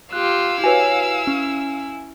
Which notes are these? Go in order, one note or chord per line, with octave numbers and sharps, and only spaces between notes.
F4 G4 F5 E6 F#6
E4 F#4 B4 C#5 G#5
C#4